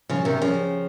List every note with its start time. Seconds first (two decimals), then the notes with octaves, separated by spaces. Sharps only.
0.09 C#3 F3
0.25 C3 D#3
0.41 C#3 F3